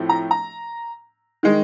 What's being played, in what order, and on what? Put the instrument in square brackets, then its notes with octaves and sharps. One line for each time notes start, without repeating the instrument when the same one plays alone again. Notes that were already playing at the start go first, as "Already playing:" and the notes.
Already playing: [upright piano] A2 F3 A3 C4
A#5
A#5
D#3 G#3